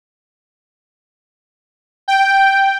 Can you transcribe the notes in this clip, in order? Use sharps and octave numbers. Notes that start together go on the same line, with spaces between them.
G5